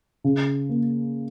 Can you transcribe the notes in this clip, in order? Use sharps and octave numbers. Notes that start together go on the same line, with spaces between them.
C#3
A#3